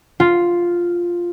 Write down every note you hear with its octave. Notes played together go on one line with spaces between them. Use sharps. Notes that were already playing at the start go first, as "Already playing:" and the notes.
F4